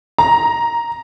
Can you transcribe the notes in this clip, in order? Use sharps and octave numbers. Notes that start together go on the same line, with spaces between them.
A#5